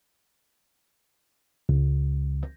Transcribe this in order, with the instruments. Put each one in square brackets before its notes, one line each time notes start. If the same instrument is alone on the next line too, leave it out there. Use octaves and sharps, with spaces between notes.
[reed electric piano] C#2